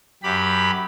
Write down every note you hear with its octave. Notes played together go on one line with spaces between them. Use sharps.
F#2 G4 B5